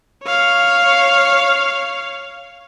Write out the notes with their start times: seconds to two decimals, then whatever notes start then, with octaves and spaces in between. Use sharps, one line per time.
0.24 C#5 F5